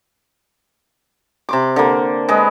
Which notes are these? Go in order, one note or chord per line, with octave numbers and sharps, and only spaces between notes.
C3 C6 D6
D3 A#3
G#3 B4 D#5